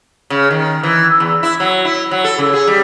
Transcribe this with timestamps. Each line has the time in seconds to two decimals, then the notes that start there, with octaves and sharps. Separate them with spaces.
0.30 C#3
0.51 D#3
0.83 E3
1.20 E2
1.43 E4
1.60 F#3
1.85 E4
2.11 F#3
2.24 A4
2.38 C#3
2.53 G#4
2.67 G3